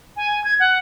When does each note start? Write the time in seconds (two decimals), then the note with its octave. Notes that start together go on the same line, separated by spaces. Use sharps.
0.17 G#5
0.44 G#6
0.60 F#5